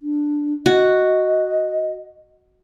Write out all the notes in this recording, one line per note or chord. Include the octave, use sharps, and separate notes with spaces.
D4
F#4 D#5